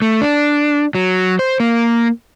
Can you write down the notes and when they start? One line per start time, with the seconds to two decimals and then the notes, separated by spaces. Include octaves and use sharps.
0.02 A3
0.21 D4
0.95 F#3
1.39 C5
1.60 A#3